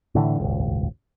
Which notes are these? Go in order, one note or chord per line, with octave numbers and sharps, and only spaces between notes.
A2 D3 E3
D#1 G#1 C#2